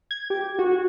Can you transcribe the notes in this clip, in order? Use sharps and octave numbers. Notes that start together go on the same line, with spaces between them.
G#6
G4
F#4